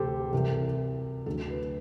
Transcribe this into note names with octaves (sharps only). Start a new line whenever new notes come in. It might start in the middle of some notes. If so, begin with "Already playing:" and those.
Already playing: D2 C3 E3 G4 A4 C5
C2 C3 E3
D2 D3 F#3 A4
B4